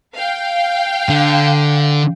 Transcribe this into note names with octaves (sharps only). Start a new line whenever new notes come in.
F5 G5
D3